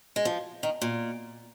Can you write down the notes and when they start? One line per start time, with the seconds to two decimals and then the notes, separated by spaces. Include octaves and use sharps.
0.16 G#3
0.25 F3
0.63 D#3
0.82 A#2